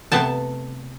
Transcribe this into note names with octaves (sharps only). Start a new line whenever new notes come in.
C3 A3 B3 A5